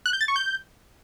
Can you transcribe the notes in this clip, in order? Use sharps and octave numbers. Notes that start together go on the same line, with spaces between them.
F#6
G6
A6
C#6
G6